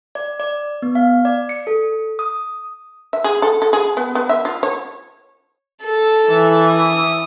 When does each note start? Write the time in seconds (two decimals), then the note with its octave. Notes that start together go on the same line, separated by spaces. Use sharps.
0.15 D5
0.40 D5
0.82 B3
0.95 F5
1.25 D5
1.49 C#7
1.67 A4
2.19 D#6
3.13 E5
3.24 G#4
3.42 A4
3.62 A4
3.73 G#4
3.97 B3
4.15 B3
4.29 E5
4.45 F4
4.63 C#5
5.84 A4
6.28 E3 E5
6.71 D#6